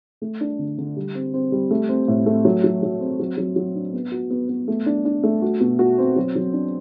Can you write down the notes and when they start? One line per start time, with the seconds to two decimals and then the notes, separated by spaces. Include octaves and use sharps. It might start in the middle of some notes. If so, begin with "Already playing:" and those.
0.22 A3
0.41 D4
0.59 D3
0.78 D3
0.96 G3
1.15 C4
1.34 C4
1.52 G3
1.71 A3
1.89 C4
2.08 A2
2.26 A3
2.45 F#3
2.64 F#3
2.83 F#3
3.00 C4
3.19 F#3
3.37 F#3
3.56 F#3
3.75 D4
3.93 B3
4.12 F#4
4.30 B3
4.49 B3
4.68 A3
4.86 D4
5.05 D4
5.23 A3
5.42 F#4
5.60 B2
5.79 F#4
5.98 C4
6.16 F#3
6.35 F#3
6.53 D4